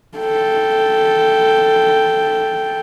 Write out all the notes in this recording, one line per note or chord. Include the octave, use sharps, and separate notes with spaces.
A4 G5